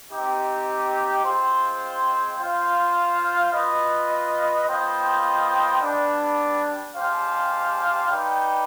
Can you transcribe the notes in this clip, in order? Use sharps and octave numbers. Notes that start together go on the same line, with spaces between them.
C4 D#4 G4
G#3 C4 F4 C5
F4 C5 F5
F4 B4 D#5
B3 F4 C5 D#5 G5
G3 B3 D4
G#3 D4 G4 C5 F5
D#4 B4 D5 G5